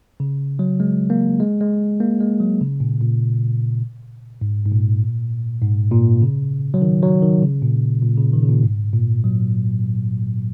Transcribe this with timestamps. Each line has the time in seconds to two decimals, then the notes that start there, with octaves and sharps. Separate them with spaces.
0.20 C#3
0.59 F#3
0.80 G#3
1.10 A#3
1.40 G#3
1.61 G#3
2.00 A#3
2.20 G#3
2.40 F#3
2.61 C#3
2.80 A#2
3.01 A#2
4.41 G#2
4.65 G#2
4.71 A#2
5.62 G#2
5.91 A#2
6.22 C#3
6.74 F#3
6.82 D#3
7.02 F#3
7.22 D#3
7.43 C#3
7.62 A#2
8.02 A#2
8.17 C#3
8.33 D#3
8.42 C#3
8.48 A#2
8.63 G#2
8.94 A#2
9.24 F#3